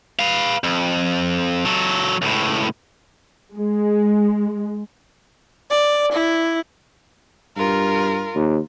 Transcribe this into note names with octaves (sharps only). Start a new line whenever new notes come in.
B4 F5
F2
F#3 A4
C#2 A2
G#3
D5
E4
G2 F4 A#4
D#2